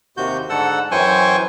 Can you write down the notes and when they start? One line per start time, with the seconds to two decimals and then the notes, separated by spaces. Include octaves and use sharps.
0.17 D#2 C3 F#4 G6
0.49 G#2 D3 A4 F#5 E6
0.91 F#2 E3 C5 G5 G#5 C#6